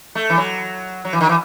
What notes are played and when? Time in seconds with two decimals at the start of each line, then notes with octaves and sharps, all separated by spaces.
0.15 A3
0.30 E3
0.37 F#3
1.05 F#3
1.13 E3
1.21 D#3
1.29 E3